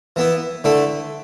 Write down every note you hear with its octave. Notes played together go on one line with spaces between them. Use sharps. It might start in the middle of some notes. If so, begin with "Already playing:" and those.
E3 B3 E4
D3 A3 E4